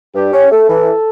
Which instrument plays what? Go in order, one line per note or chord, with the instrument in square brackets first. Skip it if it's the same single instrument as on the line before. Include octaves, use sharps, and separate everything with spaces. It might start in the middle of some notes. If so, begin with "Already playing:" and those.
[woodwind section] G2 [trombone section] G4
[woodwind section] C#4
[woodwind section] A3 [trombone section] A4
[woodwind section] E3